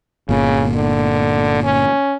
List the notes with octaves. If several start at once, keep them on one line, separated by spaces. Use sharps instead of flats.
G1 A#2 C#3
D3
C#4